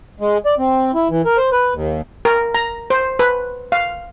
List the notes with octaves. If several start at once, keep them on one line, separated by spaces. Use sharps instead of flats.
G#3
D5
C4
E4
E3
A#4
C5
B4
D#2
A#4
A#5
C5
B4
F5